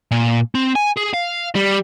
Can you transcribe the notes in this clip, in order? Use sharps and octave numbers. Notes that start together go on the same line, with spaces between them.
A#2
C4
G#5
G#4
F5
G3